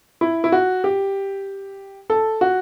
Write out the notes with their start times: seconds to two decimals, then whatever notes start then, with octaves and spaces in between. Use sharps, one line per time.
0.21 E4
0.44 E4
0.52 F#4
0.84 G4
2.10 A4
2.41 F#4